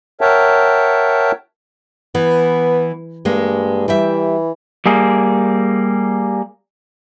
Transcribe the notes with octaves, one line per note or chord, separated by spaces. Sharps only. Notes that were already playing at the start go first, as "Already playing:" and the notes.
A#4 C#5 E5 F#5 G5 A5
E3 B3
G2 G#3 A#3
E3 G3 G4 E5
G3 A#3 G#4